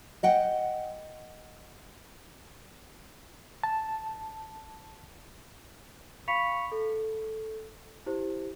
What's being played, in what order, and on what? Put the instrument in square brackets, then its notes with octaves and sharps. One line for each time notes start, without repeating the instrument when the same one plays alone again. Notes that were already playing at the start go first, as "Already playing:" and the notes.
[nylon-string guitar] D#5 F#5 G5
[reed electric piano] A5
[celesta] F5 B5 C#6 B6 C#7 F7
A4
E4 G4 C5